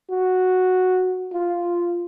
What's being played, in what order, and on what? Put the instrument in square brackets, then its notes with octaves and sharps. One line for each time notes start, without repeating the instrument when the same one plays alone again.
[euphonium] F#4
F4